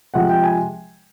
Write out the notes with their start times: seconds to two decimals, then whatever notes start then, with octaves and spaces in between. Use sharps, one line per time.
0.14 C3 F3 G#3 F#5
0.29 G5
0.44 G#5